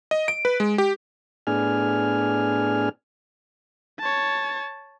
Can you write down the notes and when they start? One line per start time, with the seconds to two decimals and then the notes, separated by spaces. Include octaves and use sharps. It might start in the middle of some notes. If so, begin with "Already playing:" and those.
0.11 D#5
0.28 D7
0.45 B4
0.60 G#3
0.78 G4
1.47 A2 B3 D4 G#4 G#5 F6
4.00 C#5 A5